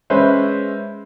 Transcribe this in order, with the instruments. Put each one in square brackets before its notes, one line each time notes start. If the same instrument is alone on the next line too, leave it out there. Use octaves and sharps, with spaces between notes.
[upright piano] G#3 C#4 B4 C5 E5